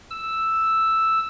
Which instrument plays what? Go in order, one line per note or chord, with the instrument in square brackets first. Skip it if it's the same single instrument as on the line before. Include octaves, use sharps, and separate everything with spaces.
[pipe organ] E6